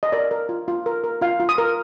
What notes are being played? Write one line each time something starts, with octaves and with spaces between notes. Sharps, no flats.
D#5
A#4 D5
A#4
F4
F4
A#4
A#4
F4 F5
F4
D#6
A#4